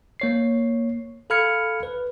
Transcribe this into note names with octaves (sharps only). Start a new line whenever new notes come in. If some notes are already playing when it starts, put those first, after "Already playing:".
A#3 C#5 C7
A4 F5 B5 F6 G#6 C#7
B4